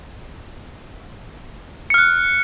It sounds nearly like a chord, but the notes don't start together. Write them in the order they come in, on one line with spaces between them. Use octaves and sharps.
C#7 F6 F#6